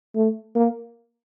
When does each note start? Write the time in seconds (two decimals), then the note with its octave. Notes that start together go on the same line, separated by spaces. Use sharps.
0.15 A3
0.55 A#3